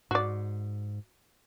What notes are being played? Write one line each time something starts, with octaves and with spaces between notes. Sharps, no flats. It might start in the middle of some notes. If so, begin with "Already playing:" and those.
G#2 F#4 D5